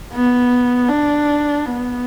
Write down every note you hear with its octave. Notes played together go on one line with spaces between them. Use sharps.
B3
D4
B3